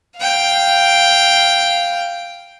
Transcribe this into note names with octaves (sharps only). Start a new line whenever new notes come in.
F5 G5